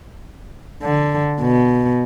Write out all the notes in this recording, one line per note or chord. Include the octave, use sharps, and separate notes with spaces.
D3
B2